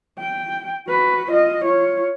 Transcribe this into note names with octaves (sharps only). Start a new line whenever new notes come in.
G5
F#4 B4
F4 D#5
F4 C#5